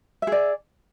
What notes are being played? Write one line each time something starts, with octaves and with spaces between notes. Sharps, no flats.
G#4 D5 E5